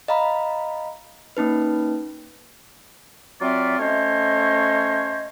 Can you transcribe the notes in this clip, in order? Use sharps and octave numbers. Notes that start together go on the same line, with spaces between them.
D#5 F5 A#5 B5
A#3 C#4 D#4 B4
F#3 C4 F4 D5 E5
A3 C#4 C5 C#5 D#5